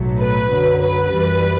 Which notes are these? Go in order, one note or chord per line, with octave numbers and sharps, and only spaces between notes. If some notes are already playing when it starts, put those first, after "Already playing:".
Already playing: B1 A2 F#3 A3
B4
F#2 D3 F#3
B4
F#2 E3 G3